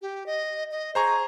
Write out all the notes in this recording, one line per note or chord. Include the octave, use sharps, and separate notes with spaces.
G4
D#5
D#5
G#4 C5 A#5 C#6